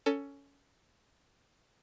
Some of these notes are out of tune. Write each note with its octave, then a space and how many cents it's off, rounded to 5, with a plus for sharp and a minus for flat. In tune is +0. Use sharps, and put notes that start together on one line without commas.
C#4 +15 A4 +20